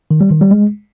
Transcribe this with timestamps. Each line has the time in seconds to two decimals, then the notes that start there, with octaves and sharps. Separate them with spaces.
0.11 D#3
0.21 G3
0.31 D#3
0.41 G3
0.51 G#3